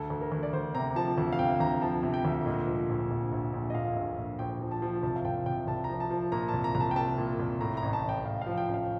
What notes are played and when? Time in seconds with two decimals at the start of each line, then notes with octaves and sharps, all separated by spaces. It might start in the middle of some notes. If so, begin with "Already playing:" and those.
Already playing: D2 A4
0.10 D2
0.21 A#4
0.32 D2
0.43 D5
0.53 D2 C5
0.75 C3 A#5
0.96 F3 A5
1.18 D2
1.32 F5
1.39 C3 G5
1.60 D2 A#5
1.82 F3 A5
2.03 C3
2.14 G5
2.25 D2
2.46 A#2 D#5
2.68 F3
2.89 A#1
3.11 A#1
3.32 A#1
3.53 A#1
3.70 D#5
3.75 A#2 F5
3.96 A#1
4.18 A#1
4.39 A#1 G5
4.60 F3
4.71 A5
4.82 F3
5.03 C2 A5
5.16 F5
5.25 C2 G5
5.46 C2 G5
5.67 C2 A5
5.84 A#5
5.89 F3
6.00 A5
6.10 F3
6.32 A#2 A#5
6.48 A5
6.54 C2
6.64 A#5
6.75 C2 A#5
6.80 A5
6.91 G5
6.96 C2 A5
7.18 A#2
7.40 C2
7.61 A2 A#5
7.77 A#5
7.82 A1
7.93 A5
8.04 A1 G5
8.25 A1 F5
8.42 F5
8.47 F3
8.58 G5
8.68 A1
8.74 F5